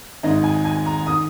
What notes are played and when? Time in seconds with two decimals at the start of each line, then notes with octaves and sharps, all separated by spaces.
0.23 G#1 G#2 D#3 D#5
0.44 G#5
0.65 G#5
0.86 A#5
1.07 D#3 D#6